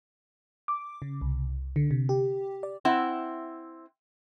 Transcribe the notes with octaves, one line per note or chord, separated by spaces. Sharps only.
D6
C#3
C2
D3
C3
G4
D5
C4 E4 F#5